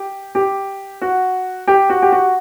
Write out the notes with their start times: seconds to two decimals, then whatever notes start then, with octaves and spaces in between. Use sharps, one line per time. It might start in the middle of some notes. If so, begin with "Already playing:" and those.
Already playing: G4
0.35 G4
1.01 F#4
1.67 G4
1.89 F#4
2.02 G4
2.12 F#4